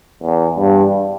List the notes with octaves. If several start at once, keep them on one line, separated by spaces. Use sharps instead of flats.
E2
G2